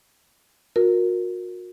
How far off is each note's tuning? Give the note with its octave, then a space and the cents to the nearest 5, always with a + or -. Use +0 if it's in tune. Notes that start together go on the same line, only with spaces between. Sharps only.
F#4 -35 A#4 +0